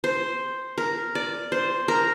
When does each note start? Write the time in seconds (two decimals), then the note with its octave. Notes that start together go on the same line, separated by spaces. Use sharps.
0.04 C5
0.78 A#4
1.15 D5
1.52 C5
1.88 A#4